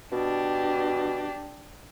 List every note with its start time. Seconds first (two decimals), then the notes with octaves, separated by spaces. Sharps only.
0.12 B2 D4 G4